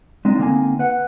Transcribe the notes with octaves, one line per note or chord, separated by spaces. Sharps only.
G#3 C4 D4 D#4
D3 A#3 C4 D#4 G#5
B4 F#5